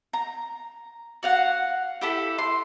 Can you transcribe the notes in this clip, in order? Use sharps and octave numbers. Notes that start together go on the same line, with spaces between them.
A#5
F#4 F5 F#5
E4 G4 A4
C6